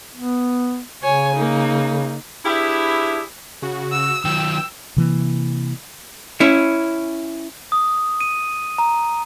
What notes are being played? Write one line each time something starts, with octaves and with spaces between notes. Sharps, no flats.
B3
C#3 C#5 G#5
A#3 D#4
D4 E4 G4 G#4 B4 E5
C#3 F#4
E6
D#3 F#3 G5 E6
C3 E3 A#3
C#4 E4
D#6
D#7
A#5